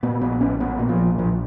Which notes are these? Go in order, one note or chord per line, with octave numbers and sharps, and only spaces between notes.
A#2 B3
A#1 B3
A#1 C#4
A#2 B3
A#2
F3
A#1
A#1 F3